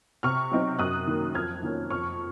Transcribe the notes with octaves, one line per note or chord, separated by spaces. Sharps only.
C3 C#6 F6
F#3 C4 D#4
F#2 D#6 F#6
D#3 A#3
F2 F6 G#6
D#3 A#3 C#4
F2 C#6 F6